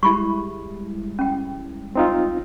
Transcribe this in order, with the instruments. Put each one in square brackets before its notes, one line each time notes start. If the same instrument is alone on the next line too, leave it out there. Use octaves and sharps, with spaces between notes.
[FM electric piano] G3 G#3 E4 [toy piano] G4 B5 C#6
[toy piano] C#4 G5
[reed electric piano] C4 D#4 F4